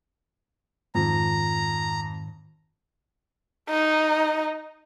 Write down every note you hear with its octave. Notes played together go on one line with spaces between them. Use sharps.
F2 G#2 D#3 A#5
D#4